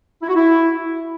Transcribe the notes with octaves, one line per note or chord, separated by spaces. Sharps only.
E4
F#4
E4